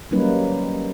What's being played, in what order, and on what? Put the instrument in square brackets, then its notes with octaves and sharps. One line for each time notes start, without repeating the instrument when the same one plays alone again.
[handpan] F#3 G3 A#3 C#4 D#4 B4